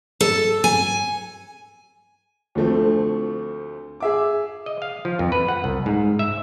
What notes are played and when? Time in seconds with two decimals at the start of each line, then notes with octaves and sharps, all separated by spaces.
0.21 A4
0.64 G#5
2.55 D2 F3 A3 C4
4.00 G#4 E5 D6
4.66 D#5
4.82 F5
5.05 F3
5.19 F2
5.32 B4
5.48 F#5
5.64 C2
5.86 G#2
6.19 E5